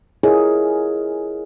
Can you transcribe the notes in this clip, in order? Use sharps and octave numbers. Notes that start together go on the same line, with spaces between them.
E4 F4 G#4 A#4 C#5 D#5